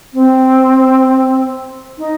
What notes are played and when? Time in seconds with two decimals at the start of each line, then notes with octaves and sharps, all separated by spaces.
0.13 C4
1.98 D#4